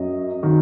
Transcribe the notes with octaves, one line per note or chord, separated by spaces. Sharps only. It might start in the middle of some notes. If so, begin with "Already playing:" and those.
Already playing: F#2 F#3 D#5
D#3 F#3